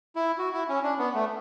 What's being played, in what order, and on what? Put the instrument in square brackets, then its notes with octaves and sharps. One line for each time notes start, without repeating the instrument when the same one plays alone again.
[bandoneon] E4
F#4
E4
C#4
D4
B3
A3